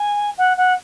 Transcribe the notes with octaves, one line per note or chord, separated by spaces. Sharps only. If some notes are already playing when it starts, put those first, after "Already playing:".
Already playing: G#5
F#5
F#5